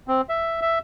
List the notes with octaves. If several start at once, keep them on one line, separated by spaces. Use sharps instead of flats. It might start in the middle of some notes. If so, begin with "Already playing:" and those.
C4
E5
E5